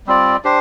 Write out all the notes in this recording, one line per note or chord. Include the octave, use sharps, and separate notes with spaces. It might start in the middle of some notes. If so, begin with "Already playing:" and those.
G3 C4 F4 D5
D4 G4 C5